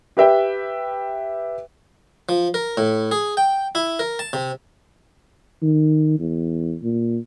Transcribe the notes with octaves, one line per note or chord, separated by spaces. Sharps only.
G4 B4 E5 G5
F3
A#4
A2
G#4
G5
E4
A#4
A5
C3
D#3
E2
A#2